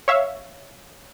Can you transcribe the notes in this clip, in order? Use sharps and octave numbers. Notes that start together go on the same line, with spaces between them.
C#5 E5 F5